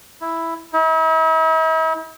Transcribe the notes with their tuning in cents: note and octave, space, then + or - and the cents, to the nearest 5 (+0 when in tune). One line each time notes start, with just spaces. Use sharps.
E4 +0
E4 -45